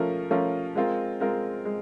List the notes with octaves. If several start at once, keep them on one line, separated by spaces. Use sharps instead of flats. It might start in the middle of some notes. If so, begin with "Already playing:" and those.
Already playing: F3 A3 C#4 F4 A#4
F3 A3 C#4 F4 A#4
G#3 C4 F4 A#4
G#3 C4 F4 A#4
G#3